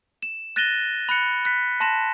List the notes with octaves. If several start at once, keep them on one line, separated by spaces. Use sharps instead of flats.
E7
F#6 A6 A#6 D#7 E7 G7
B5 F#6 C#7
F#6 B6
A5 C6 A#6 E7